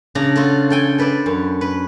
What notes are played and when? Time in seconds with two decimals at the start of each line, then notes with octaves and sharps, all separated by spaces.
0.15 C#3 D4 A#5
0.36 F4 F#4 A4
0.70 A4 G5 G#5
0.98 A4 B4 C5 D5
1.26 F#2
1.61 B4